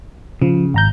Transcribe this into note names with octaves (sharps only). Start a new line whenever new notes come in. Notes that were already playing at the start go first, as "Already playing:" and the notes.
C#3 F3
G#1 A#5 G6